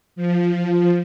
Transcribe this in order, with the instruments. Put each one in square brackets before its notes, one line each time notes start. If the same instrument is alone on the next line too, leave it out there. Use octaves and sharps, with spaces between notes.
[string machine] F3